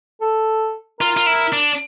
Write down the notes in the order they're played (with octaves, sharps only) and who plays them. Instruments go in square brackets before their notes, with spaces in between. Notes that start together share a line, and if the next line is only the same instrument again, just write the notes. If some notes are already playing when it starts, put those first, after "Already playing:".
[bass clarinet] A4
[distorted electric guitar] F4 [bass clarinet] A#4
[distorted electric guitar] F4
E4
D4